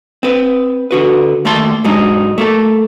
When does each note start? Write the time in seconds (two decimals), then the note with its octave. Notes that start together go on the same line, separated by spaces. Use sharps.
0.23 C4 B4
0.91 D3 F#4 B4
1.45 D#2 A3 A#3 A5 C6
1.84 G#2 F#3 G#3 D4 D#4
2.38 A3 A#3 A4